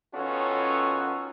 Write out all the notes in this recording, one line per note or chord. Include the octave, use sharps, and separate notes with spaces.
D#3 B3 C#4 F4 F#4 A4